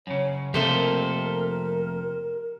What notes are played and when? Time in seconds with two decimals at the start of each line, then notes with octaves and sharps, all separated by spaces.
0.07 F#2 C#3 C#5
0.54 F2 C3 A3 A#3 G4 A4 A#4 C5